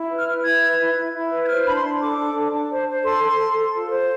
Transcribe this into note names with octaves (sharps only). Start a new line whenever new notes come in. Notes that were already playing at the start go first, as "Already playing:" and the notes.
Already playing: E4
B4
F6
B4
E4 G#6
B4
E4
E4
E4
B4
G#6
C5 F6
D4 B5
C6
D4
A4 D6
D4
D4
D4
C5
C5
A4 C6
A4
A4
A4
F4
C5